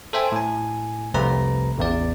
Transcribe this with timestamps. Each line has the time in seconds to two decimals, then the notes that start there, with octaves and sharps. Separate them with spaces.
0.13 A4 C5 E5 G5 G#5
0.32 A2 G#5
1.14 C2 F2 C3 A3 B4 A#5
1.78 A1 E2 D5